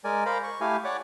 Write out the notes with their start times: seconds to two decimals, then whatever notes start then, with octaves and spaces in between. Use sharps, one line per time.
0.04 G#3 A#4 D5 G#5
0.26 A#4 C5 F5 A#5 B5
0.44 C#6
0.61 A3 E4 G4 F5 G#5
0.84 C#5 D5 F#5 D6